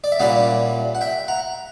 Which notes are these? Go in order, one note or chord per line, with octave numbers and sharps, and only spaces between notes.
D5
E5
A#2 G3 A#3 C#4 E4 D5 F#5
F#5
E5 G5
F#5 A#5